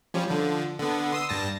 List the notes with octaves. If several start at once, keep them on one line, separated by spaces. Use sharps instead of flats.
F3 G3 C#4
D3 F3
D3 B3
C6 D#6 E6
G2 A5 A#6